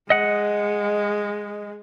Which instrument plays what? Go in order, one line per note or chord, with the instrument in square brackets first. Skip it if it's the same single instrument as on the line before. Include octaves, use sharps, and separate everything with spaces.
[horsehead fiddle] G#3 [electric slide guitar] D#5 F#5